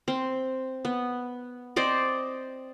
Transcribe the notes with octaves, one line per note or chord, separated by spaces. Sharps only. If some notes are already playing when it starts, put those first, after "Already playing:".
C4
B3
C4 C5 D5 D#5